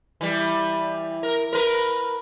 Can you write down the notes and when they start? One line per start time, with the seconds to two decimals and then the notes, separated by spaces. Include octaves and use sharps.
0.21 E3 G3
1.23 A#4
1.53 A#4 B4